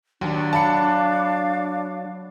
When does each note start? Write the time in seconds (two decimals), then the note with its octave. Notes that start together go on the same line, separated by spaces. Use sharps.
0.21 D#2 F#3 D4
0.53 F5 A5 B5 C#7